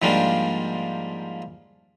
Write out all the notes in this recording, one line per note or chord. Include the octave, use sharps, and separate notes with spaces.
G#2 F3 G3 A#3 D4